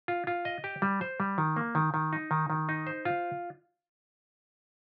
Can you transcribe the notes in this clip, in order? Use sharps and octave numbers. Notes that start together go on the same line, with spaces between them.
F4
F4
D#5
G4
G3
C5
G3
D#3
A#3
D#3
D#3
D#4
D#3
D#3
D#4
C5
F4